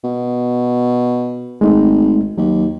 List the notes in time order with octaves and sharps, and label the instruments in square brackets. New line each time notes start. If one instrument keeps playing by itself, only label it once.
[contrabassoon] B2
[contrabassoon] G#1 [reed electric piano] G#3 A3 D#4
[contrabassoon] D#2 [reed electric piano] F#3